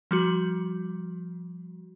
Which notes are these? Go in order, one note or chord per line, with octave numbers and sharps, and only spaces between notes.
F3 G3 F#4